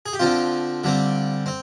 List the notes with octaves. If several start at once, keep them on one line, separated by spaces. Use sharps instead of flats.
G#4
G4
D3 F3 C4 F4
D3 G3 C4
C4